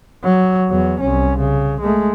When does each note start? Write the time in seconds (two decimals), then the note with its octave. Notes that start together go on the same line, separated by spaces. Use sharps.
0.23 F#3
0.70 E2 F#3
1.00 C2 C#4
1.39 C#3
1.81 G#3 A3